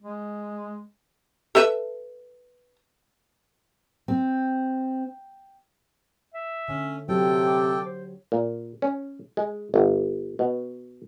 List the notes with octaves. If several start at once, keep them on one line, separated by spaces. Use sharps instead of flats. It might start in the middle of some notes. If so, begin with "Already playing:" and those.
G#3
A4 B4 E5
C4
E5
D3 C#4
C3 F#3 G4 A4 C#5 G5
D6
C5
A#2
C#4
G#3
G1
B2